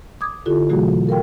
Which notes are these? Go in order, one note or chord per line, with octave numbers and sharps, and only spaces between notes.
D6 D#6 G#6
D3 E4 F4 G4 A4
B2 E3 F#3 A3 F#4 G#4
A4 A#4 F5 G5